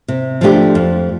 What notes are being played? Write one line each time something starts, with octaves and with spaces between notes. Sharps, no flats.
C3
F3 A3 D4 G4
F2